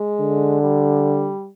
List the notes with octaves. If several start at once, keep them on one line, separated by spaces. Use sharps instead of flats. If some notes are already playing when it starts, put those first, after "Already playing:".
Already playing: G#3
D3
G3